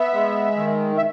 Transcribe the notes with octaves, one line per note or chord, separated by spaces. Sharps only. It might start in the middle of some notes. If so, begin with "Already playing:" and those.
Already playing: B3 E5
G#3
D#3
E5